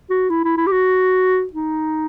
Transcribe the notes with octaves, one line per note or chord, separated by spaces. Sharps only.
F#4
E4
E4
E4
G4
F#4
D#4